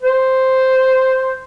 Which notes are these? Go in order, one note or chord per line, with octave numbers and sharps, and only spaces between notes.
C5